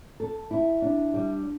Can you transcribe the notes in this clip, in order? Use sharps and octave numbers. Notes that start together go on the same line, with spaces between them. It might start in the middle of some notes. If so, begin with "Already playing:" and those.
A4
E4
D4
G3